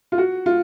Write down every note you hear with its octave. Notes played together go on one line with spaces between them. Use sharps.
F4
F#4
F4